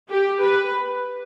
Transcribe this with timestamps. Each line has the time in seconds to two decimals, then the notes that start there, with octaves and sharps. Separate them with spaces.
0.09 G4
0.42 B4